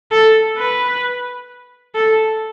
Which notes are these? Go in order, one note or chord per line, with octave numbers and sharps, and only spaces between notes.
A4
B4
A4